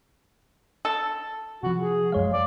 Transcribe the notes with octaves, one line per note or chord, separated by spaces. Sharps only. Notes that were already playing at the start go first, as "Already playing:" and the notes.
A4
C3 F3 F#4
G#4
F#2 G#3 C#5 F5
D5